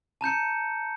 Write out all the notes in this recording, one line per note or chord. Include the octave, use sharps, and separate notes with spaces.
A5 A#5 G6 C#7